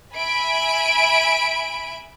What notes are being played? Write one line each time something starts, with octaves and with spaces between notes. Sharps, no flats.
E5 G#5 B5 D7